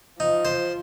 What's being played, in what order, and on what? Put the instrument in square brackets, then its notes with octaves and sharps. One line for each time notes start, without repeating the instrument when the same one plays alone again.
[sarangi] F3 [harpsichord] D#4
[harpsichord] C5